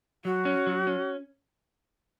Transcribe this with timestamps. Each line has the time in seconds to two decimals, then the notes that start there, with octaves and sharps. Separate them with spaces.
0.25 F#3 F#4
0.45 C#4
0.67 F#3
0.87 C#4